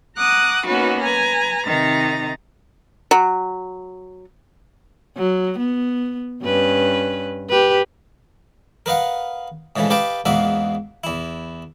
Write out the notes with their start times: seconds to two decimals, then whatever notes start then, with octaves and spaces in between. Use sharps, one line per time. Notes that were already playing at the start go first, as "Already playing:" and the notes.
0.18 F#5 A#5 D6 D#6 F#6
0.66 A#3 B3 C#4 D#4 F#4 B4
1.02 B4 G#5 A#5
1.66 C3 D#3 D#4 A#5 A6
3.11 F#3
5.17 F#3
5.58 B3
6.43 G2 C#4 B4
7.50 G4 B4
8.86 A#4 B4 D#5 F5 F#5
9.76 G#2 C#3 E3 F3 A3
9.90 G4 B4 D#5 F5 G5 A5
10.25 E2 G#2 A#3 F#4 E5 F5
11.04 E2 E4